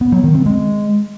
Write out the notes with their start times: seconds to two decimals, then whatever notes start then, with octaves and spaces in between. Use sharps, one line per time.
0.01 B3
0.12 F#3
0.23 D#3
0.35 C4
0.46 G#3